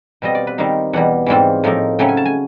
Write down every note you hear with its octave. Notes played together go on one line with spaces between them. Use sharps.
B2 G3 C4 F4 D#5
D5
B4
D#3 G3 C4 D#4 F5
E2 B2 G3 F#5
G#2 E3 G3 C4 F4
A2 F3 A#3 D#4
C#3 F#3 A3 C#4 G5
G#5
A5
G#5